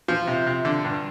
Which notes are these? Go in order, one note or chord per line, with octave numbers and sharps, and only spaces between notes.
F3
C3
C3
D3
G2